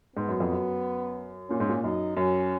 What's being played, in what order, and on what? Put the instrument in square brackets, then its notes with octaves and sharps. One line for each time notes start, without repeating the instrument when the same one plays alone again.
[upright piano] G#2 [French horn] B3
[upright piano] F#2
F2
F#2
[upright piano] A#2 [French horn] C#4
[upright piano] G#2
A#2
[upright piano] F#2 [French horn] D#4
[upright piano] F#2 [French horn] C#4